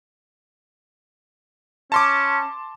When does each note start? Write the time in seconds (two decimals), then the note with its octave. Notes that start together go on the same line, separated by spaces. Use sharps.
1.92 C#4 A5 C6 D6